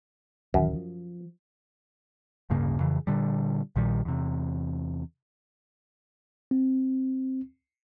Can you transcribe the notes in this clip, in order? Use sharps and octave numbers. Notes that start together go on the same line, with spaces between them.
D1 F#2 D#3 E3
F3
D1 G2 C#3 A#3
F2 C#3 E3
A#2 D3 G3
A#1 A#2 D#3 G3
E2 C3
C4